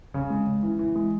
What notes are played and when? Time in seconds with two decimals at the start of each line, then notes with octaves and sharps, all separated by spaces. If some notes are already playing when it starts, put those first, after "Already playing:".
0.14 C#3
0.30 G#3
0.47 C#3
0.63 E3
0.79 E3
0.96 G#3